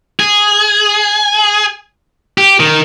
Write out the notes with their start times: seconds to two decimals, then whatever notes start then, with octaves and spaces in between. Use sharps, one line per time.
0.20 G#4
2.38 G4
2.60 D#3